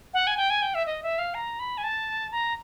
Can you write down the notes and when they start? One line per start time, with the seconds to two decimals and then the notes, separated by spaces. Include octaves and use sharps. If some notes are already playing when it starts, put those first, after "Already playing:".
0.14 F#5
0.27 G#5
0.37 G5
0.50 G#5
0.62 G5
0.75 E5
0.86 D#5
1.03 E5
1.19 F5
1.34 A#5
1.60 B5
1.78 G#5
1.84 A5
2.32 A#5